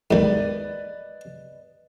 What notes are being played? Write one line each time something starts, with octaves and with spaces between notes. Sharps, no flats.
D#2 G#2 B4 D5 D#5